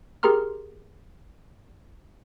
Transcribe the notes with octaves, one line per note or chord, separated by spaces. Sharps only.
G4 G#4 A#4 A#5 C6 F6